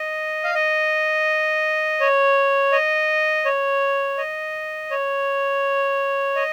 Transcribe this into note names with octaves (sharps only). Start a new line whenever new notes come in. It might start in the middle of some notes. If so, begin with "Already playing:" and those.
Already playing: D#5
F5
D#5
C#5
D#5
C#5
D#5
C#5
D#5